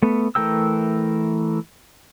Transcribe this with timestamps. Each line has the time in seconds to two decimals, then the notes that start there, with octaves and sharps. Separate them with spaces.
0.03 A3 B3
0.35 E3 A3 A#4 G5 E6